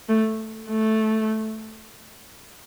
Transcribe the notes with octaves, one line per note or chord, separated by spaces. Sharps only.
A3
A3